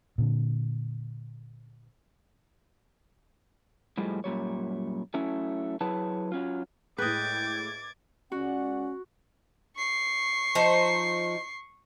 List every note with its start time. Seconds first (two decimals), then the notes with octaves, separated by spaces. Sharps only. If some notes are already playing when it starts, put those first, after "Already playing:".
0.18 A#2 D3
3.98 A2 F3 G3 G#3
4.24 F#2 A#2 G3 C#5
5.14 F#3 A3 C#4 E4
5.81 F#3 E4 G#4 B4 C#5 A5
6.32 F#3 C#4 F4
6.98 A2 G#3 B4 D#5 G5 D6 G#6 A6
8.32 C#2 C#4 F#4 D5 F#5
9.76 C#6 C7
10.55 F3 D#4 C5